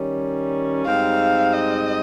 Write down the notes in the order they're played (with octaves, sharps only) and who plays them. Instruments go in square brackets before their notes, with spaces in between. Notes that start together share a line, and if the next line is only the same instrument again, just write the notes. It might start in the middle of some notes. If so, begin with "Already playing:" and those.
Already playing: [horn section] D#3 G3 C#4
[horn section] G#2 G3 C4 D#4 [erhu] F5
[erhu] D#5